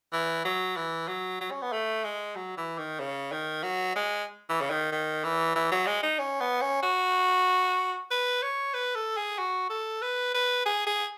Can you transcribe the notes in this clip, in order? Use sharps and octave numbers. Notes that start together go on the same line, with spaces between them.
E3
F#3
E3
F#3
F#3
C#4
B3
A3
G#3
F#3
E3
D#3
C#3
D#3
F#3
G#3
E3
C#3
D#3
D#3
E3
E3
F#3
G#3
D#4
C#4
B3
C#4
F#4
B4
C#5
B4
A4
G#4
F#4
A4
B4
B4
G#4
G#4